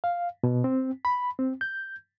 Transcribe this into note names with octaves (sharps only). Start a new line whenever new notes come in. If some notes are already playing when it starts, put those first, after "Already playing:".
F5
B2
C4
B5
C4
G6